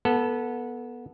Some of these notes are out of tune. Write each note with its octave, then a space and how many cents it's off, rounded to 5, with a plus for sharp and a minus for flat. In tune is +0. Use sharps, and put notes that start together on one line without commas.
B3 -20 A4 +0